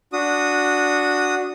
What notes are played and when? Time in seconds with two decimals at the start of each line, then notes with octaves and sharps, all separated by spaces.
0.13 D4 F#4 D#6